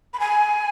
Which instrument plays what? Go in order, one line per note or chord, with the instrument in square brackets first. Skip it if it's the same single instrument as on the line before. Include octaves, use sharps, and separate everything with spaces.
[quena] B5
G#5